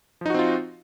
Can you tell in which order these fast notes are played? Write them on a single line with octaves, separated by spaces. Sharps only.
F3 D#4 F#4 C4 F4